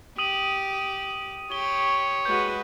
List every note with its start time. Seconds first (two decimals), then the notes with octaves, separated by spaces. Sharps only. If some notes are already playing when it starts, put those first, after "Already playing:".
0.18 G4 D#6 D#7 F#7
1.52 G4 C#5 G7
2.25 G#3 F#4 B4 G6